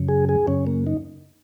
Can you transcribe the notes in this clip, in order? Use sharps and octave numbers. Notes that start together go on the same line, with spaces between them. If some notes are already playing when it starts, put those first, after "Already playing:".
Already playing: F#2 C#3
G#4
G#4
F#2 C#3 C#4
A#3
D#4